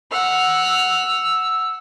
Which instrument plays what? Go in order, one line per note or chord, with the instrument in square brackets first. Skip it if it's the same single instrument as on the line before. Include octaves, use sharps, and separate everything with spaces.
[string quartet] F#5 F6 [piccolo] E6